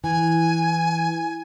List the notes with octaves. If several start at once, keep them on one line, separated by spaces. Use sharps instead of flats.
E3 G#5